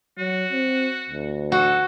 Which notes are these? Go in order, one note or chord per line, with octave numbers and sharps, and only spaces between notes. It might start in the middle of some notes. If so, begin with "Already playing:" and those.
F#3 F#4
C4
D2
F#4 A4